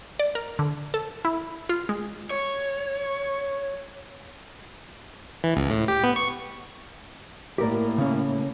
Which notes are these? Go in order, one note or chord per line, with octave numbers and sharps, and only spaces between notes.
D5
A#4
D3
A4
E4
F4
G#3
C#5
E3
C#2
A2
G4
B3
C#6
A2 A#3 G4 A#4 D5
C#3 C#4